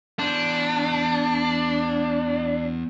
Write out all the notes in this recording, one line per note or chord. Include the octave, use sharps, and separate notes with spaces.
E2 D4 C5